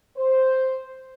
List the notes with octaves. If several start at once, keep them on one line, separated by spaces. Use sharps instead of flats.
C5